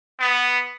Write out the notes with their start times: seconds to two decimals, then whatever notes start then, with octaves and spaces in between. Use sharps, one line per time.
0.20 B3